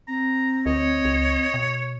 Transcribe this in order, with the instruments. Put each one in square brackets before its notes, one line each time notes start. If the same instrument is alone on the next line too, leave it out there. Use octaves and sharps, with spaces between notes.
[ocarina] C4 [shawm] A#5
[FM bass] D2 [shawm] C#5 [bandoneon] D#5
[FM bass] C#2
B2